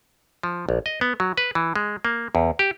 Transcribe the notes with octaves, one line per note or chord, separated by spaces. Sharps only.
F3
A#1
D#5
B3
F#3
B4
E3
G#3
A#3
E2
G4